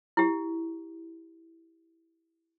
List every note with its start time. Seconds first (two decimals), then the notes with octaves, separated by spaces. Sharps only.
0.17 E4 G4